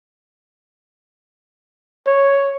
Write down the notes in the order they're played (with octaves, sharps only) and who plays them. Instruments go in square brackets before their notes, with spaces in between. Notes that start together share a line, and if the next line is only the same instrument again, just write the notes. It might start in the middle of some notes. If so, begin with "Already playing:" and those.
[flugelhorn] C#5